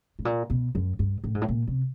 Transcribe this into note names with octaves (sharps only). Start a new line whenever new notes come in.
A2
A#2
B2
F#2
G2
A2
G#2
A2
A#2
C3